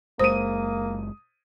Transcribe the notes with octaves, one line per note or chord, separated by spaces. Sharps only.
F#1 G#3 A#3 C5 D#6 D#7